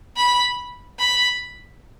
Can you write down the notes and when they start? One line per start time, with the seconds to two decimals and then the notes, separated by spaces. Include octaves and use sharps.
0.17 B5
0.99 B5